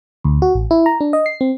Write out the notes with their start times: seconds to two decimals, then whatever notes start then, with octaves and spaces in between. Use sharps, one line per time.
0.25 D2
0.42 F#4
0.55 A1
0.71 E4
0.86 A#5
1.01 D4
1.13 D#5
1.26 C7
1.41 C4